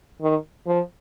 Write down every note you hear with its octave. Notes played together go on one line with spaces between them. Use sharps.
D#3
F3